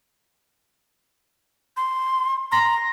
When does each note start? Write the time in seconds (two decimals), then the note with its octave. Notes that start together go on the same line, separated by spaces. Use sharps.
1.77 C6
2.52 A#5 C6 A#6